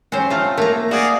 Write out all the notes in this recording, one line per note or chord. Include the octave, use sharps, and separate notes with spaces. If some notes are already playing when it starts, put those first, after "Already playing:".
C4 C#4 C5
A3 F4
A3 A#3 A#5
F#4 G#4 D5 F5